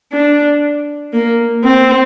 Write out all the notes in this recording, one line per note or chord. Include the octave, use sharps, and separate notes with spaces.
D4
A#3
C4